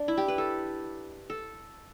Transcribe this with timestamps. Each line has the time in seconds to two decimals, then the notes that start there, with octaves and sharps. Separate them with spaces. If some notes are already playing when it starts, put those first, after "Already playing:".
Already playing: D4
0.08 E4
0.18 G4
0.28 B4
0.38 A4
1.30 A4